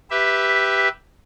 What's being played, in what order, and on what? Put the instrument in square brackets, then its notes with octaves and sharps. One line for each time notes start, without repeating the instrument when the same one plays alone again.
[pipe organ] G4 B4 E5